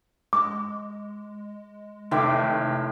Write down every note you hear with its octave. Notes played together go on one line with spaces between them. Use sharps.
G#3 D6
F1 A2 D#3 E5 G5 D6